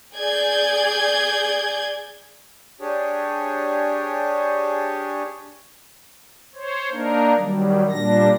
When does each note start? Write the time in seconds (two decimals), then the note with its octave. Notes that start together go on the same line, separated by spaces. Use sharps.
0.14 G#4 D5 G6 G#6
2.81 D4 G4 G#4 C#5
6.55 C5 C#5
6.91 A#3 D4 D#4 A#4
7.36 D#3 F#3 G3
7.90 A#2 G3 D4 A#6